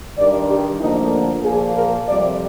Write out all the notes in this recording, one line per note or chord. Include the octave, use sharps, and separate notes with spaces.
G2 D#3 G3 D5
G4
D2 D3 F3 A#3 D#4
A#2 F3 A#3 G#4
A#4
F2 C3 G3 D5